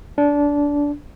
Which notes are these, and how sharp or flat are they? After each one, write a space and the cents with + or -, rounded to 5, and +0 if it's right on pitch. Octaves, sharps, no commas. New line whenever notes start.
D4 -20